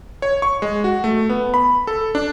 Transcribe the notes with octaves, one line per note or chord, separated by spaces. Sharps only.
C#5
C#6
G#3
F#4
A3
B3
B5
A4
D4